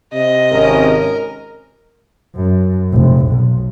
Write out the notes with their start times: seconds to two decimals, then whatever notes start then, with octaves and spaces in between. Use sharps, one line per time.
0.14 C3 D#5
0.52 G#1 C#4 A#4
2.36 F#2
2.93 F1
3.27 B1